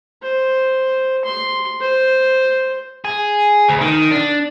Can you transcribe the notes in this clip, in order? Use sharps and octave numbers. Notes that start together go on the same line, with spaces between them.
C5
C6
C5
G#4
D2
D#3
D4